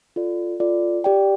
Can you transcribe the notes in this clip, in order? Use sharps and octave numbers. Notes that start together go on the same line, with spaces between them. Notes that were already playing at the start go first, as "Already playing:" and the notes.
F4 A4 D5
F4 A4 D5
G4 D5 G5